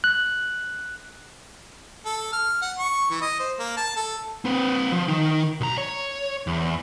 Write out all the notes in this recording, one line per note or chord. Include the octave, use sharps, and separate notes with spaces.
F#6
A4
F6
F#5
C#6
E3
D#5
C5
A#3
A5
A4
C4 B4
F3
D#3 D#4
B1 A#5
C#5
E2